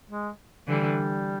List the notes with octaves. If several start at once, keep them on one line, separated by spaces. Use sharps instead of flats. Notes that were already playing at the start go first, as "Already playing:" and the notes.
G#3
D3 E3 G3